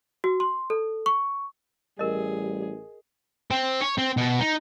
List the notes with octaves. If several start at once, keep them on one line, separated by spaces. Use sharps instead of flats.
F#4
C6
A4
C#6
A1 G3 G#4 A#4 D#5
C4
C#5
C4
B2
D#4